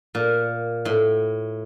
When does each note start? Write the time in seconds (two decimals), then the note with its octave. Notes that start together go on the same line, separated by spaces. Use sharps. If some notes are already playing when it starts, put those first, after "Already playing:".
0.15 A#2
0.85 A2